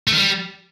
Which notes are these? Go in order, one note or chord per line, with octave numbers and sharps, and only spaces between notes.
A3
D#3
G3